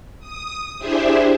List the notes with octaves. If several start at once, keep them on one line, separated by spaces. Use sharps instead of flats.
D#6
D4 E4 G4 G#4 C5 E5